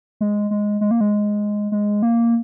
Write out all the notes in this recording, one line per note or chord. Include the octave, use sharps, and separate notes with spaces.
G#3
G#3
G#3
A#3
G#3
G#3
A#3